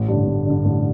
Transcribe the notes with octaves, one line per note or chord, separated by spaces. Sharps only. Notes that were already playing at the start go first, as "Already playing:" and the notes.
Already playing: A1
G2 D3
A1
G2 D3
A1